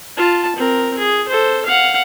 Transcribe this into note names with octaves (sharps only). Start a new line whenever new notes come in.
F4 A5
C4 A#4
G#4
A4 C5
F5 F#5